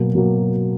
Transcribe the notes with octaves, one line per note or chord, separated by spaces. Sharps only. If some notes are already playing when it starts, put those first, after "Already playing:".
Already playing: B2 F#3 A#3
B2 F#3 A#3